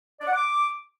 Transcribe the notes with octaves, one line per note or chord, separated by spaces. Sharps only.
D5
F#5
D6